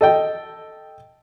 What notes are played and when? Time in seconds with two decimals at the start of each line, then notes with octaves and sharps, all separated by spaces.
0.01 A4 D#5 G5